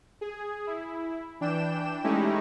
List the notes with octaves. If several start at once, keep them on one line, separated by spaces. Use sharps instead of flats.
G#4
E4
E3 D4 G5 E7
G#3 A3 C#4 D#4 E4 G4